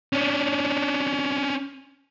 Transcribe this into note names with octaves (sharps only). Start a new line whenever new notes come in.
C#4 D4